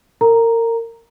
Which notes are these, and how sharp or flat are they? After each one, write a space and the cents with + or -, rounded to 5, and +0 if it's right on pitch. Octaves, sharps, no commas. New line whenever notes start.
A#4 -30 A#5 +0